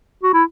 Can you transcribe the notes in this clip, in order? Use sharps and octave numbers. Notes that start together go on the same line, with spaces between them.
F#4
E4